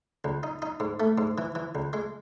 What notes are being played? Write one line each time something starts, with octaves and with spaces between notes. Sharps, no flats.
C#2
D#4
D#4
G#2
A3
G#2
E3
E3
C#2
G#3